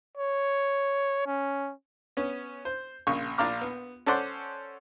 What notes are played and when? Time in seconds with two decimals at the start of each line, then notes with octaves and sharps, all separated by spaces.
0.17 C#5
1.26 C#4
2.17 B3 C#4
2.65 C5
3.07 A#1 C#3 C#6
3.38 A#1 D4 F4 A#5 D6 F6
3.61 B3
4.06 C#4 A4 C5 D5 F#5 C6